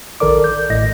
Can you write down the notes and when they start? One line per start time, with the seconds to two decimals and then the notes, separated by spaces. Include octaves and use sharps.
0.20 A#1 D#3 A4 A#4 D5 D6
0.44 G6
0.70 A1 A2 D#5 A#6